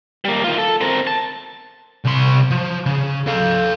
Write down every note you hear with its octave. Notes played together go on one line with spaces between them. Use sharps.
G3 A#3
D#3 F4
A4
C4 A#4
A5
C2 C6
F3
C#3
A4 F5